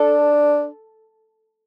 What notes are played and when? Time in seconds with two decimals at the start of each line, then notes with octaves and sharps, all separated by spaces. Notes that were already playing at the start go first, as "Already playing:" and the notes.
Already playing: D4 A4